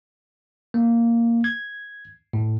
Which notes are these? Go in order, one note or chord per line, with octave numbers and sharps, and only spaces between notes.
A#3
G#6
A2